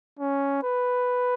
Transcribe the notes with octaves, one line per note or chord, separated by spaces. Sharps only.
C#4
B4